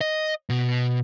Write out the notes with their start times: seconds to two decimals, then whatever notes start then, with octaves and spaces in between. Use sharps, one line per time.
0.01 D#5
0.50 B2